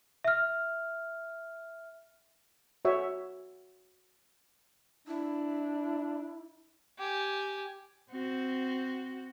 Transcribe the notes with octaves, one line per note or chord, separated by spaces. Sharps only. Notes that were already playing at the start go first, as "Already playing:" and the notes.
E5 F6
F#4 C#5 E5
D4 E4
G4 G#5
C4 F#4